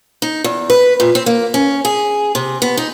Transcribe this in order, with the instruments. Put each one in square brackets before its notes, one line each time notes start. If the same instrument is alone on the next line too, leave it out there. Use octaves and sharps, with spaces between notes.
[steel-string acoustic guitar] D#4
E2
B4
A#2
C4
A#3
C#4
G#4
C3
B3
D#4